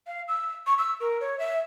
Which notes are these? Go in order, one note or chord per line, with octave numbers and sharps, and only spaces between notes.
F5
E6
C#6
E6
A#4
C#5
E5